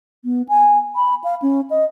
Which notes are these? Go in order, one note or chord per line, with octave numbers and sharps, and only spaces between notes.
B3
G#5
B5
F5
C#4
D#5